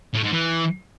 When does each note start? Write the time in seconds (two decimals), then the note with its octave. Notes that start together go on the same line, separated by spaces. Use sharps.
0.14 A2
0.23 G#2
0.33 E3